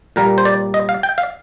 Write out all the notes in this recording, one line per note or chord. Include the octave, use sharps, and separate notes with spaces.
A#2 G3 A#3 A#4
C5
D5
D#5
F5
G5
F5